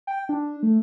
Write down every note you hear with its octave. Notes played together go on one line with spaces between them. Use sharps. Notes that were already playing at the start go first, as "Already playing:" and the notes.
G5
D4
A3